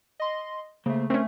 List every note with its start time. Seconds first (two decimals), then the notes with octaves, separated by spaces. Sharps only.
0.20 D#5 C6
0.86 C#3 A3 A#3 C5
1.10 A3 C4 C#4 A#4 C5